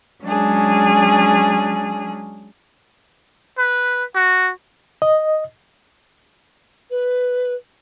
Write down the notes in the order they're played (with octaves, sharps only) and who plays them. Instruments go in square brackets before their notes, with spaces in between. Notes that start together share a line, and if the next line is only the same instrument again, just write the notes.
[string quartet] F#3 G#3 C#4 D4 G#4
[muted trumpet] B4
F#4
[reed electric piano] D#5
[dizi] B4